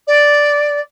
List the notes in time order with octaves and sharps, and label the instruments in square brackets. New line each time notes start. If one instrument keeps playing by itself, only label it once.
[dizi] D5